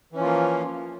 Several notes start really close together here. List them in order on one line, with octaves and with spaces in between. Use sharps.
E3 C#4 F3 F4 A#3